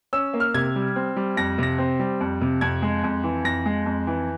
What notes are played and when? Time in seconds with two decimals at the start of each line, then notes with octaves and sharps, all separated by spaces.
0.13 C#4 E6
0.34 A#3
0.40 F6
0.54 C3 G#6
0.76 G3
0.96 C4
1.16 G3
1.37 F2 A#6
1.58 C3 A#6
1.78 C4
1.99 G3
2.21 F2
2.41 C3
2.61 F2 G#6
2.82 G#3
3.03 F2
3.23 E3
3.45 F2 A#6
3.66 G#3
3.86 F2
4.07 E3